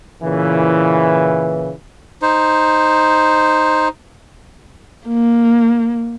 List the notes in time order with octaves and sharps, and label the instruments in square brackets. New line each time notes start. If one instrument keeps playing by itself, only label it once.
[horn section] A#2 C#3 E3
[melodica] D#4 C5
[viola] A#3